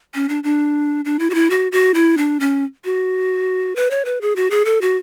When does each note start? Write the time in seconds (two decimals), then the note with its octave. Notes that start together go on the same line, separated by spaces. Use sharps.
0.15 C#4
0.29 D4
0.44 D4
1.05 D4
1.19 E4
1.30 F#4
1.34 E4
1.50 F#4
1.72 F#4
1.94 E4
2.17 D4
2.40 C#4
2.85 F#4
3.76 B4
3.90 C#5
4.05 B4
4.21 G#4
4.36 F#4
4.50 G#4
4.65 A4
4.81 F#4